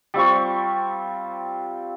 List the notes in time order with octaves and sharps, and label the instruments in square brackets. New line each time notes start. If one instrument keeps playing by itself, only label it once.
[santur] G3 C4 F4 C#6